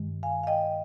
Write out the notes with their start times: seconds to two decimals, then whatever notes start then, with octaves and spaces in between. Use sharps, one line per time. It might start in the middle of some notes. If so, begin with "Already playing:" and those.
Already playing: G2 D#3 G#3
0.23 F5 G#5
0.44 F5
0.47 D#5 G5